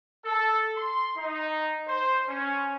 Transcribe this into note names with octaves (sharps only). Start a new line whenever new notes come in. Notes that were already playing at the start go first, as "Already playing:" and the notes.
A4
C6
D#4
C5
C#4